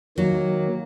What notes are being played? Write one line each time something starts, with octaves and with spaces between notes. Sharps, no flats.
D#3 F#3 A#3